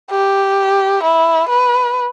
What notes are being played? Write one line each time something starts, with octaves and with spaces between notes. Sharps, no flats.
G4
E4
B4